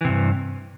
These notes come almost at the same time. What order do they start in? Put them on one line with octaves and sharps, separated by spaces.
E3 C3 G2